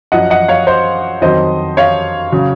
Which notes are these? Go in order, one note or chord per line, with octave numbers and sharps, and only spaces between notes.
F#2 F3 D#5 F#5
D#5 F#5
C#5 F5
C5 D#5
F2 D#3 F#3 C5 D#5
C#5 F5
C#3 F#3